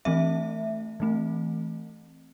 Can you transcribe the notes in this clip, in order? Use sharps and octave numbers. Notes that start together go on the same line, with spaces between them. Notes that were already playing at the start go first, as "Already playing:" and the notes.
E3 A3 C4 E5
E3 A3 C4